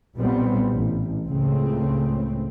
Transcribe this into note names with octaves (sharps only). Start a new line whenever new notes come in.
B1 A#2 G3 B3 C4
A1
C#2 A2 C#3 C4